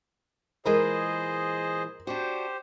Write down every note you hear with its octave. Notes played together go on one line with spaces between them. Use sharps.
A#2 E3 G#3 G#4 A#4 C5 D#5
D4 F#4 G4 C5